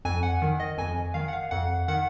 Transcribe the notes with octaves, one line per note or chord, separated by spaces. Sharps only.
F2 G#5
F#5
D#3
D#5
F2 G#5
D#3 F5
F#5
F5
F2 F#5
D#3 F#5